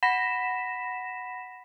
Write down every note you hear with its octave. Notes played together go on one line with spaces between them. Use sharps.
F#5 B5 A#6 B6 E7